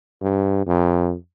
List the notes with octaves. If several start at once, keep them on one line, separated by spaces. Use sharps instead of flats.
G2
F2